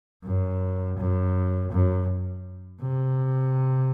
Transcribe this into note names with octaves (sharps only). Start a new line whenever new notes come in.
F#2
F#2
F#2
C3